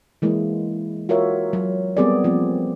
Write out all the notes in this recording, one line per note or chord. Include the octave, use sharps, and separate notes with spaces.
E3 G#3 A#3 E4
F4 F#4 A#4 C#5 E5
F#3
G3 B3 C4 G#4 A#4 D5
F3 A#3 C4